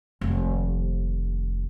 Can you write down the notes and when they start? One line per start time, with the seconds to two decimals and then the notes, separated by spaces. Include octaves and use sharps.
0.21 F1 D#2